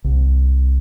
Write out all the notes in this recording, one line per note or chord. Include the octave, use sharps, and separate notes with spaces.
C2